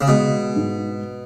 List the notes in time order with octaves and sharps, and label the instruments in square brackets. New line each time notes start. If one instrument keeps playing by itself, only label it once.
[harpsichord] C#3
[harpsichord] B2 [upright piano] G#3
[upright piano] G#2